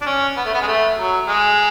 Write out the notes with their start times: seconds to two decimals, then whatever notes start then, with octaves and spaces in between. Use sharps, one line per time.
0.01 D4
0.06 C#4
0.37 B3
0.45 A3
0.54 B3
0.61 G#3
0.67 A3
0.97 F#3
1.28 G#3